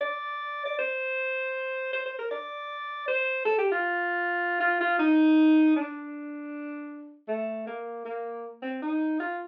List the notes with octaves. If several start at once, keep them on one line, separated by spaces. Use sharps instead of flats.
D5
D5
C5
C5
C5
A#4
D5
C5
A4
G4
F4
F4
F4
D#4
D4
A3
A#3
A#3
C4
D#4
F4